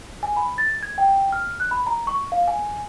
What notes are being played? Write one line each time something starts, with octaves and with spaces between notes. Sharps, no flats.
G#5
B5
A6
G#6
G5
F6
F#6
B5
A#5
C#6
F5
G#5